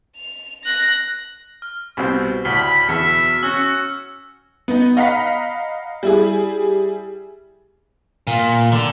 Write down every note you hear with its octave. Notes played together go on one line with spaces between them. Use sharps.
F7
F#6 A#6
F6
C2 B2 C4
D2 A2 B5 F6
E2 B2 E5 C#7
C#4 F#4 E6
B3 D#4
D#5 F5 F#5 A#5 B5 B6
G3 E4 G#4
A#2
D3